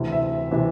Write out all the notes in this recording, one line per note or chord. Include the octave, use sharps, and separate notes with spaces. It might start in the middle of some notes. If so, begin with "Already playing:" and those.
Already playing: D2 C3 E3
E5
C3 E3